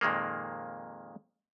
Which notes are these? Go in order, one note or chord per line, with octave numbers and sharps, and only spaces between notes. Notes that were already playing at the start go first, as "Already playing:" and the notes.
F2 A#2 D#3 G#3 A#3